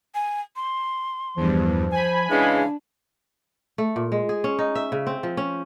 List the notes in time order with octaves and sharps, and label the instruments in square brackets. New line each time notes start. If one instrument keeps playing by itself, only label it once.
[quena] G#5
C6
[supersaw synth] E2 G2 [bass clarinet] F3
[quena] C5 [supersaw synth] G#5 B5
[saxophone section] C#3 E3 G#3 [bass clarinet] D4 [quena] F5
[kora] A3
A#2
G#3
G#4
C#4
D#4
E5
C#3
C4
F3
C#4